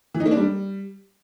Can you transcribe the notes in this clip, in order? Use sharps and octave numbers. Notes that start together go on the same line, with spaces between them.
E3
D#4
A#3
D4
G3